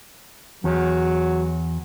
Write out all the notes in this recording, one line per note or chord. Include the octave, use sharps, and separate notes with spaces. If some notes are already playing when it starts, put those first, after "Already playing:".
E2 F#3